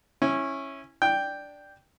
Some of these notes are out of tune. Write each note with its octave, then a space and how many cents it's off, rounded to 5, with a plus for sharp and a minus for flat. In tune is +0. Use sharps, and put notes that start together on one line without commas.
C#4 -15 E4 -5
D4 +0 G5 +0